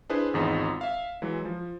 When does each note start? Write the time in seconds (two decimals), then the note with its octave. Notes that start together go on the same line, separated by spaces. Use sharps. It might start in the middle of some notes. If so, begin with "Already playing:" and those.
0.10 D4 E4 G#4 B4 C5
0.34 G#1 E2 D#4 F4 G#4
0.81 E5 F5
1.22 E3 F#3 G#3 E4
1.45 F3